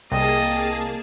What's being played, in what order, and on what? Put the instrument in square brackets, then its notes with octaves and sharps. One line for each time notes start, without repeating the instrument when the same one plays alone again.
[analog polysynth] C2 [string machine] A#3 G#4 A5 [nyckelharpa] D#5 [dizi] G5